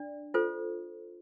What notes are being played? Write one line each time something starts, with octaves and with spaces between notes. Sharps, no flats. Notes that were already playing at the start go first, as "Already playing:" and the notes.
Already playing: D4 D5
F4 A4 C5